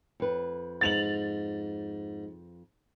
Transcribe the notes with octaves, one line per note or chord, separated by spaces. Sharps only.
F2 B4
G#2 A6 F7 F#7